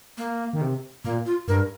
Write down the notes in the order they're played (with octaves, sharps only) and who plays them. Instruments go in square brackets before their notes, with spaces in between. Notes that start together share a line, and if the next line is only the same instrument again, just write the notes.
[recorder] A#3
[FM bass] D#3
C3
[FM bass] A#2 [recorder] A#3
[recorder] F4
[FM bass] G2 [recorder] A#4